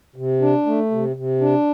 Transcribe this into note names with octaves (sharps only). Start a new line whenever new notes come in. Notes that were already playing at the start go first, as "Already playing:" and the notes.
C3
D4
A3
C3
C3
D4